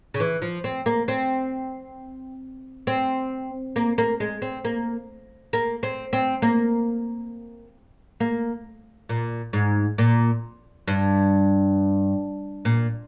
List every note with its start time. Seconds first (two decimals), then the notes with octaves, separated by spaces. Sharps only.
0.14 C#3
0.20 E3
0.42 F3
0.64 C4
0.86 A#3
1.08 C4
2.87 C4
3.76 A#3
3.98 A#3
4.20 G#3
4.42 C4
4.65 A#3
5.53 A#3
5.83 C4
6.13 C4
6.42 A#3
8.20 A#3
9.09 A#2
9.53 G#2
9.98 A#2
10.88 G2
12.65 A#2